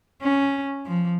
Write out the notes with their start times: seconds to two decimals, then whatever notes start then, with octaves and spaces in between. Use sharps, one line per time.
0.22 C#4
0.86 F3